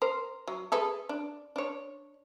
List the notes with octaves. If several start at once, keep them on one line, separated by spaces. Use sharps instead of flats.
A#4 C5
F#3
G#4 A4 B4
D4
D4 C#5